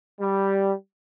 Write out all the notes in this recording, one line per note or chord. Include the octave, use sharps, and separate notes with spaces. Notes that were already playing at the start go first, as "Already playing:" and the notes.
G3